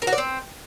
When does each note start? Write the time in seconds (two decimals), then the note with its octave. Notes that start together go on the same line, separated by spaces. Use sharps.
0.02 A#4
0.07 F#4
0.13 D5
0.18 C4